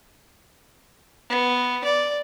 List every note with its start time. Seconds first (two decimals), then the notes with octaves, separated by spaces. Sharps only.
1.30 B3
1.85 D5